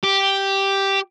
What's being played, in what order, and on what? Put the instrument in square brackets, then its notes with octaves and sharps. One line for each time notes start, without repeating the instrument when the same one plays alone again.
[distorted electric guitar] G4